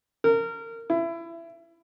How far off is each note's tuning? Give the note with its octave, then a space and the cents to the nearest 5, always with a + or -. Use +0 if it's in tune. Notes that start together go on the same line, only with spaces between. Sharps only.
A#4 -25
E4 +25